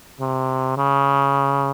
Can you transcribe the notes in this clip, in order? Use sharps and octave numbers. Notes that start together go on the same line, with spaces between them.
C3
C#3